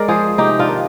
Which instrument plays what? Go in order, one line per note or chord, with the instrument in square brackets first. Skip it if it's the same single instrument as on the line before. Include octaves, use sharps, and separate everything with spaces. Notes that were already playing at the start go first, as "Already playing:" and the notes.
Already playing: [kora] G#3 A#4 D5
F3 G#4 C5
C3 D#4 G4
D4 F4
D#3